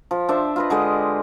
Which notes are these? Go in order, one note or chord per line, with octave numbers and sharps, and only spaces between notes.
F3
D4 C5 E5
F4 B4 D#5
D3 G#3 G4 D#5